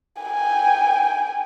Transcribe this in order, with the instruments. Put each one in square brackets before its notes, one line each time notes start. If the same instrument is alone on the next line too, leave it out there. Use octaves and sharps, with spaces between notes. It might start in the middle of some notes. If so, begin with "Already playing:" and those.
[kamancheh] G5 G#5